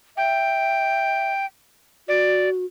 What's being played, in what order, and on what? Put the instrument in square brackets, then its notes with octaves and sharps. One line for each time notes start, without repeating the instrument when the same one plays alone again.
[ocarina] E5 [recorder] G5
[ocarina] F#4 [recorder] D5